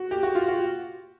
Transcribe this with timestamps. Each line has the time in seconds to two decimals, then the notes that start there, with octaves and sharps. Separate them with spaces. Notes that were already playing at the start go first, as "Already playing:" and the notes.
Already playing: F#4
0.11 G4
0.23 F#4
0.35 F4
0.48 F#4